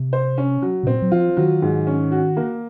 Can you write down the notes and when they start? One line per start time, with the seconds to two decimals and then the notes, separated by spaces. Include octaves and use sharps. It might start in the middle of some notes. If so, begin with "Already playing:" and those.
Already playing: C3
0.13 C5
0.38 C#4
0.62 F#3
0.83 C3
0.87 A#2 C4
1.02 F#3
1.12 F3 F4
1.37 D#3 F#3
1.62 G#2
1.87 C#4
2.11 F#4
2.37 A#3